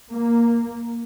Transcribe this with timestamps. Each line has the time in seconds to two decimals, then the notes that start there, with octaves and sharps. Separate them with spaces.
0.11 A#3